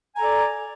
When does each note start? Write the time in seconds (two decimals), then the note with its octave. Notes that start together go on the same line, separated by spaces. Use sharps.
0.14 G#5
0.17 A#5
0.20 A4
0.23 D5